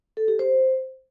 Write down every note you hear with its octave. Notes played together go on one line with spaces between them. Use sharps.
A4
G4
C5